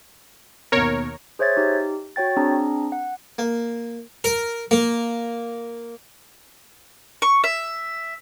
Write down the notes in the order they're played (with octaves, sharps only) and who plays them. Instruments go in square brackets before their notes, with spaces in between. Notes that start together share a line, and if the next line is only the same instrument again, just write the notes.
[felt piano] D#2 B2 [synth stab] A#4 C#5
[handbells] G#4 C5 C#5 E5 G#6 A6
D#4 G4
F#4 C#5 G5 A6
C4 D4 G#4 A#5
F#5
[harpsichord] A#3
A#4
A#3
[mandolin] C#6
E5